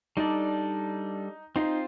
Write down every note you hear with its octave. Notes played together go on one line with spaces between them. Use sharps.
G3 D4 D#4 A4 D5
C4 D#4 F4 C5